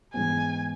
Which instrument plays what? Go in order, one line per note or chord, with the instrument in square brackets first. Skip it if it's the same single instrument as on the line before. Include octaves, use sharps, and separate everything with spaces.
[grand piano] G#2 E3 G#3 B3 [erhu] G#5